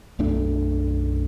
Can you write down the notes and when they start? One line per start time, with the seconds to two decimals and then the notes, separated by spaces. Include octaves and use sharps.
0.19 B1 F#2 A3 D4